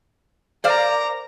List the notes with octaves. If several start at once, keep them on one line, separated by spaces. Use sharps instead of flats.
A#4 C5 D5 F5 A#5